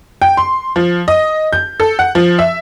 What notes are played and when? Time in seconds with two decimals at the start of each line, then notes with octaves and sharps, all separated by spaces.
0.22 G5
0.37 C6
0.76 F3
1.08 D#5
1.53 G6
1.80 A4
1.99 F#5
2.15 F3
2.39 E5